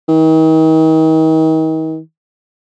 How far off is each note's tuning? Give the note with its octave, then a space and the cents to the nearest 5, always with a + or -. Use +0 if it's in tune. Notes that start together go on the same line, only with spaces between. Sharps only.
D#3 +40